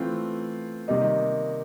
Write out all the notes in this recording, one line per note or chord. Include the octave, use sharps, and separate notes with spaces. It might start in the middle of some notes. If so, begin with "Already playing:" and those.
Already playing: E3 A3 C4 F4
C3 D#3 G3 A#3 D#4